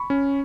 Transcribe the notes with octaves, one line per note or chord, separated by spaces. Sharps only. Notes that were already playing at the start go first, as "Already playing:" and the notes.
Already playing: B5 C#6
C#4